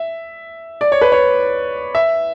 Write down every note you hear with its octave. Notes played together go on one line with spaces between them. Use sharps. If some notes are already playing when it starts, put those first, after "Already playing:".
Already playing: E5
D5
C#5
B4
C#5
E5